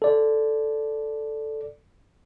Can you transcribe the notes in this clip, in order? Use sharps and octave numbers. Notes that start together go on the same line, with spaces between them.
A4 D5